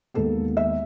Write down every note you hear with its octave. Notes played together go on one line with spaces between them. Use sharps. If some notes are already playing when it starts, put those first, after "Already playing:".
D#2 D#3 G#3 B3 A4
E5